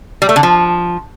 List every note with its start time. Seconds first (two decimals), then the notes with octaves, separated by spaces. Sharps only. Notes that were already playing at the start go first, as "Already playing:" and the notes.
0.22 G3
0.29 A3
0.36 D3
0.43 F3